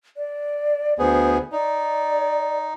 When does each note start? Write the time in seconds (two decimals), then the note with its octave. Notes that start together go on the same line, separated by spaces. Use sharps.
0.17 D5
0.99 D2 B3 G#4 C5
1.52 D#4 D5